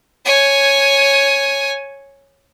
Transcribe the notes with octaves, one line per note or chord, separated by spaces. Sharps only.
C#5 G#5